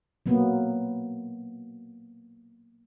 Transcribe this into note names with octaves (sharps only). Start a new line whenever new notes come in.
F#3 A#3 B3